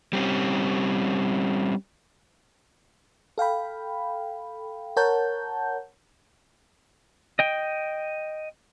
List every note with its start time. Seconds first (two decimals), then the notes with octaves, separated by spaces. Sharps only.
0.13 G3 C4 C#4
3.38 A4 F5 G5 B5
4.97 A#4 C#5 F#5 A5 G6
7.39 D#5 G5